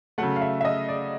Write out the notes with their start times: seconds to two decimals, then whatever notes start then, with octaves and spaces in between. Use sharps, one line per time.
0.18 C#3 F#3 A3 F#5
0.36 F5
0.42 E5
0.61 E5
0.65 D#5
0.89 D5